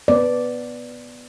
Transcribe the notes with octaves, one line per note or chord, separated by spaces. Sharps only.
B3 D5